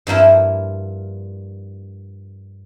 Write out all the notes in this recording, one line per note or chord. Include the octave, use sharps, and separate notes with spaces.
G2 F3 A#3 E4